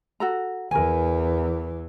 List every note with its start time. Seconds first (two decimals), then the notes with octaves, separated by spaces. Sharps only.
0.20 F#4 A4 A#5
0.71 E2 E3 A#4 G#5